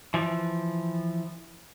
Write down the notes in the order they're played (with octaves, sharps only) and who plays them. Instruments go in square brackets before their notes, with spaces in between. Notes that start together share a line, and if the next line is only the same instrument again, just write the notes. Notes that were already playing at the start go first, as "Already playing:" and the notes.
[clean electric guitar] E3 F3